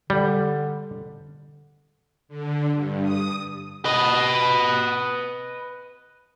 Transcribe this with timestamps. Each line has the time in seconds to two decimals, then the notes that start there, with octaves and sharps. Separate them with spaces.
0.10 D3 G3
2.29 D3
2.73 G2
3.03 D#6
3.85 B4 D#5